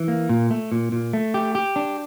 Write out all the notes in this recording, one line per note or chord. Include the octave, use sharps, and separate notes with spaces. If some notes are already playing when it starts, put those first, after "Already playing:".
Already playing: E3
A#3
A#2
A3
A#2
A#2
A3
G4
G4
D4